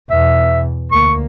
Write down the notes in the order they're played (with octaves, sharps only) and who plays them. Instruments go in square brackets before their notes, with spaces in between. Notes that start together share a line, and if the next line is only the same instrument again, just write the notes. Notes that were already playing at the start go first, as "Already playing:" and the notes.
[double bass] E2 B2 [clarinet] E5
[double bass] D2 A#3 [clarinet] C#6